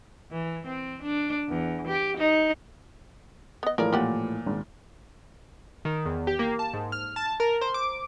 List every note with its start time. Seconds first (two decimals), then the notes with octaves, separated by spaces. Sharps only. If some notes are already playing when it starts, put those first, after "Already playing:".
0.31 E3
0.66 C4
1.03 D4
1.49 E2
1.87 G4
2.17 D#4
3.63 B3 D#5
3.78 A2 E3 F3 A#3 G#4 A#4 D5
3.92 A#2 F4 G4 F#5
4.46 G#1
5.85 D#3
6.06 E2
6.27 G4
6.39 A#3
6.59 A5
6.73 G#2
6.92 F6
7.16 A5
7.40 A#4
7.61 C5
7.74 D6